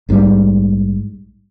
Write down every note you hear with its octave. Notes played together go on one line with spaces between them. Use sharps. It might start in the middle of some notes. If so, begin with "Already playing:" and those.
A#1 G#2 E3 G3